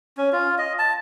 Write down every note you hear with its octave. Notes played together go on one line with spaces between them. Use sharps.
C#4
F4
D#5
A5